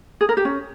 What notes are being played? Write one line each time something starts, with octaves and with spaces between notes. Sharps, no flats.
G#4
A#4
G4
C#4